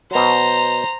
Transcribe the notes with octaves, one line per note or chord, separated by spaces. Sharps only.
B2 F#3 C5 A#5